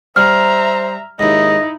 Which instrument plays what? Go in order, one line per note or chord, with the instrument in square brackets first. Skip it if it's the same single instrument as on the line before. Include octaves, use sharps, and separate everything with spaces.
[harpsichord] G3 [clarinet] C5 [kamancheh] E5 A#5 [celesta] F6
[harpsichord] D#2 G#2 [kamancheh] D#4 E4 [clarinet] D#5